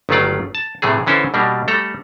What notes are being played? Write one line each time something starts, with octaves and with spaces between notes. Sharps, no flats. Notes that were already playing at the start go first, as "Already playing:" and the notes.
G1 D#3 F#3 A3 F4 D5
A5
A2 C3 E3 A3 G#4
D3 E3 C#4 E4 A4 C5
B2 G3 A#3 D4
G3 A3 A4 A#5